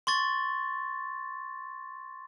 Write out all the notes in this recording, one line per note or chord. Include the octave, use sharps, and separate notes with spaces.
C6 C#6 A6